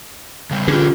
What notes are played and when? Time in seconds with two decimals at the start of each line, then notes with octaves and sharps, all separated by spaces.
0.51 C#3 G3
0.68 D3 C#4 F4 G4 G#4 B4